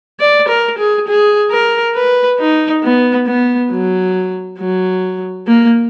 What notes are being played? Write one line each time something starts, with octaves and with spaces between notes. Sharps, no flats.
D5
A#4
G#4
G#4
A#4
B4
D#4
B3
B3
F#3
F#3
A#3